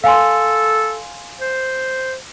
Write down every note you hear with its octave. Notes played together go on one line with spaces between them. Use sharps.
A4 F5 G#5 C6
C5